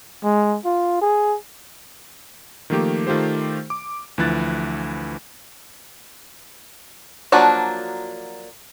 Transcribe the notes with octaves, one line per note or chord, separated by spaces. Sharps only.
G#3
F4
G#4
D#3 F3 A3 A#3 G4
D#3 A3 F4 G4 C5
D6
D2 E3 F3 E4 F#6 A6
F3 F#3 A#3 D4 F#4